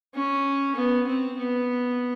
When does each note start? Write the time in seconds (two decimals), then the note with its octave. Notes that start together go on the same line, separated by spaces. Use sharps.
0.14 C#4
0.76 B3
1.06 C4
1.38 B3